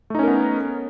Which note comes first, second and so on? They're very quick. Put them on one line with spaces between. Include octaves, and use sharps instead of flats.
A3 D#4 C#4 A#4 B3